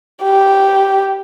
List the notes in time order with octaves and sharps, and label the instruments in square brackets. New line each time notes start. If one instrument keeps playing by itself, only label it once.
[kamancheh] G4